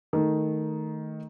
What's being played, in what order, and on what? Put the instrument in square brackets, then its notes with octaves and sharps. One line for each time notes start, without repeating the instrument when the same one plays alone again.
[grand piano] D#3 A3